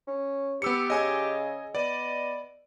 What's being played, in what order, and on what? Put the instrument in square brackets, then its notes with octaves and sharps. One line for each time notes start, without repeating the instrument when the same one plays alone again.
[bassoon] C#4
[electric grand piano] B3 E6 C#7 [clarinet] G4
[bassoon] C#3 [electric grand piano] D#5 G#5 G#6
[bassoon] B3 [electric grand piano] D5 [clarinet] D#5